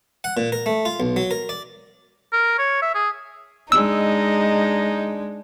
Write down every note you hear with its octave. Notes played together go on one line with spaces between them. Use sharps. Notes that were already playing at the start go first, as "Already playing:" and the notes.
F#5
A#2
A#4
A3
F4
B1
F#3
A#4
D5
A#4
C#5
E5
G#4
G#3 D4 D#4 E6